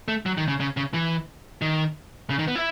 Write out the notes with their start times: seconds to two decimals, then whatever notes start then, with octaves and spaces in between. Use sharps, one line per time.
0.08 A3
0.26 F#3
0.38 D#3
0.48 C#3
0.60 C#3
0.77 C#3
0.94 E3
1.62 D#3
2.30 C#3
2.39 D#3
2.48 B3
2.56 E4